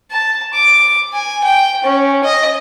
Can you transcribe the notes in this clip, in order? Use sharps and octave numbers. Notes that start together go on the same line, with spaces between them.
A5
D6
G#5
G5
C#4
D#5